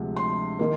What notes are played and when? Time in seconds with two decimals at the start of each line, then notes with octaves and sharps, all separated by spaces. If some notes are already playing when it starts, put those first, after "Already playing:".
Already playing: D2 C3 F3 G#3
0.16 C6
0.59 D#3 A#3